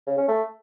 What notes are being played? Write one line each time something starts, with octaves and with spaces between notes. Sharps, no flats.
C#3
C#4
A3